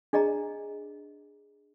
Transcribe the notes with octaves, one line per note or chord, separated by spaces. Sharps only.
D4 G#4 D5 D#5 A#5